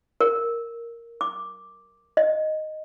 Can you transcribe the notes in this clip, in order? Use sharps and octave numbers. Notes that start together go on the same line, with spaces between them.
A#4
D6
D#5